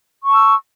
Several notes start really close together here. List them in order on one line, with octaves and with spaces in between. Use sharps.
C#6 A5 E6